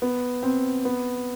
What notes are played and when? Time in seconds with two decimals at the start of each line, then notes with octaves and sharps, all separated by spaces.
0.02 B3
0.43 C4
0.85 B3